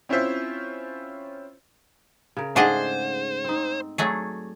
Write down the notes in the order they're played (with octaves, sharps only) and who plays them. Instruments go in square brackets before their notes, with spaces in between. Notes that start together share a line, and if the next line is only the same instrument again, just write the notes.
[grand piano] C4 C#4 E4 F4 C5 E5
[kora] C#3 A#4
[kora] G#2 A3 [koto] D4 G#4 D#5 [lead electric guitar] C5 [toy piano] F5 F#5
[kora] C4 D#4
[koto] F#3 A3 G#4 [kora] D5